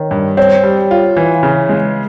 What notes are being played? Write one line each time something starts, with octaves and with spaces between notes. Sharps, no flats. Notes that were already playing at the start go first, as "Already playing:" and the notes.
Already playing: D#3 C#5
G2
C4 C#5
G3
F4
E3
C#3
G#3